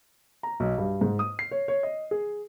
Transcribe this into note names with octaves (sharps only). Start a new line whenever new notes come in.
A#5
B1
G2
G#2
D#6
C7
C#5
C#5
D#5
G#4